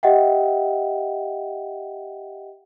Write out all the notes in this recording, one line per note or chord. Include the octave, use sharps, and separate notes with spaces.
G4 D#5 E5 F#5 G5